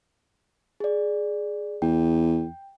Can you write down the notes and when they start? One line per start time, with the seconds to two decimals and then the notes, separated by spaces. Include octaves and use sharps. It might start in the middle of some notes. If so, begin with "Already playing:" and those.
0.80 G#4 D5
1.82 E2 G5